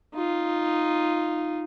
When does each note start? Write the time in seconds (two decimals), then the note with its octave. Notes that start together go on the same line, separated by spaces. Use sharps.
0.14 D#4 F4